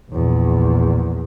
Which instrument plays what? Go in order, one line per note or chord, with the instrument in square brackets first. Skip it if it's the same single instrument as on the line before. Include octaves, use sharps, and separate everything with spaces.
[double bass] A#1 E2